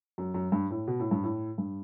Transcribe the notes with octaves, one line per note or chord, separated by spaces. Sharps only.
F#2
F#2
G2
A2
B2
A2
G2
A2
G2